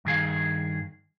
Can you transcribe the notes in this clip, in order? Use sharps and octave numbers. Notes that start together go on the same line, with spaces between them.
G2 D#3 G#4 F5